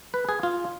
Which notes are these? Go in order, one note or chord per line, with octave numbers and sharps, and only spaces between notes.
B4
G#4
F4